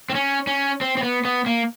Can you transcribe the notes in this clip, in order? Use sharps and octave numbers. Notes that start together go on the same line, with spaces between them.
C4
C#4
C#4
C4
C4
B3
B3
A#3